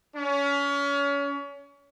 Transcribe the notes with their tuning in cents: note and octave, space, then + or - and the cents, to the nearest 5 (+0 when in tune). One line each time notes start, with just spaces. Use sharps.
C#4 +30